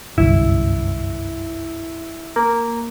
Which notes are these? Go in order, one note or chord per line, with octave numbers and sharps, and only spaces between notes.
G1 C2 F#2 E4
A#3